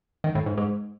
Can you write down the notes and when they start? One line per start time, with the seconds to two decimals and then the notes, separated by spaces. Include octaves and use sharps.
0.24 D#3
0.35 A2
0.46 G#2
0.58 G#2